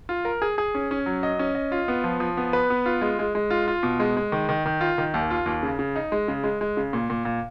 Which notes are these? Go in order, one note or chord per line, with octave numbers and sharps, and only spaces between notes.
F4
A#4
G#4
G#4
C#4
C#4
F#3
D#5
C#4
D#5
F4
B3
F3
F3
B3
B4
B3
F4
G#3
G#3
G#3
F4
F4
B2
G#3
G#3
D#3
D#3
D#3
F4
D#3
D#2
F4
D#2
C#3
C#3
D#4
G#3
C#3
G#3
G#3
C#3
A#2
A#2
A#2